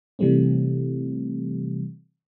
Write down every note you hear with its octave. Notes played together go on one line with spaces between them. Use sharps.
C3 E3 G3 A3 C4